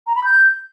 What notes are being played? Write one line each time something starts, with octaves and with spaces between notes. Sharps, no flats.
A#5
B5
G6